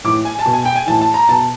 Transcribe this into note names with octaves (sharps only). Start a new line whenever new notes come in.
A2 E3 D6
G#5
A5
B2
G#5
G5
G#5
A2 E3 A5
A5
A#5
B2 A5